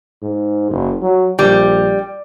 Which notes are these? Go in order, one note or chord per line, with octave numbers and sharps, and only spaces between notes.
G#2
F#1
F#3
A#1 G3